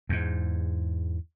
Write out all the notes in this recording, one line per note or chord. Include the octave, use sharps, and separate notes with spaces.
E2 G#2